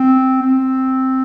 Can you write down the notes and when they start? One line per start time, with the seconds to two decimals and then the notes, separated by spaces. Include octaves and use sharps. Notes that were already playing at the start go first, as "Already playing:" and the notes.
Already playing: C4
0.42 C4